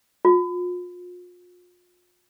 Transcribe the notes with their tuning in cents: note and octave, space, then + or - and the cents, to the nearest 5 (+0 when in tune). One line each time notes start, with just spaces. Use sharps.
F4 +40